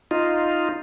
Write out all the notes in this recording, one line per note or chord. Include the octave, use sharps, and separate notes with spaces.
D#4 F4